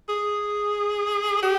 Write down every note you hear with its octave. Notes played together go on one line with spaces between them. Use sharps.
G#4
G4